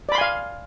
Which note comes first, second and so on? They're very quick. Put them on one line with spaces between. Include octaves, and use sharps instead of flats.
D5 B5 C6 G#5 F5